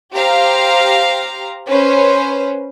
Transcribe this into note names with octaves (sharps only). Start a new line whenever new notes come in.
G4 C5 F5 A#5
C#4 B4 C5